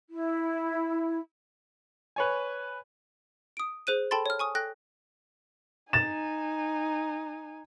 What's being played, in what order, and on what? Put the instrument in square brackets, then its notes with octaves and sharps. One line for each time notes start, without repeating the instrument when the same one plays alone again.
[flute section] E4
[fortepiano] B4 C#5 G#5
[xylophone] D#6 D7
G#4 C5 F#6 D#7
A4 G5 A5 B5 C6 A6
C#5 F6
G#5 C#6 D#6
A4 G5 F#6 A#6
[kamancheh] D#4 G#5 [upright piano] A6 E7